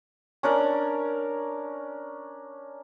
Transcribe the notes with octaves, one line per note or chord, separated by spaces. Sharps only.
C#4 D4 A#4 D5